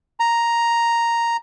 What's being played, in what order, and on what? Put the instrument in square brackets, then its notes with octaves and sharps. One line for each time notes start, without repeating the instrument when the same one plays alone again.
[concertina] A#5